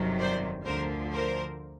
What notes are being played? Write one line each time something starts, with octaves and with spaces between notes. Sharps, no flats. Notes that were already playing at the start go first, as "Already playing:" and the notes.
Already playing: G1 F2 C3 D#3 F#3
C5 D5
D2 D3 F3 A#4 C5
A#4 C5